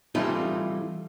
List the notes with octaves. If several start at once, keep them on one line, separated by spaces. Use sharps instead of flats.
E3 G3 A3 C4 D#4 F4